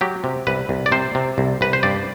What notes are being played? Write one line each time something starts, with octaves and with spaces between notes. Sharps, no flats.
F#3 G4
C3
C2 B4
C2
D5
C3 C5
C3
C2
C2 B4
C5
G2 D5